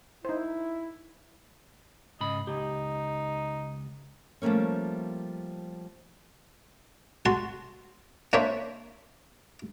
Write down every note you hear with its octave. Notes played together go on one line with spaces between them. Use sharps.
D#4 E4 C5
G#2 C#3 D#5 B5
C#2 D#4 G4
F3 G3 A3 A#3 C#4
F#4 A5 C6
A#3 D4 C5 C#5 E5